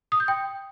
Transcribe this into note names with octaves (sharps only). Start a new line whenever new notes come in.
D#6
G6
G5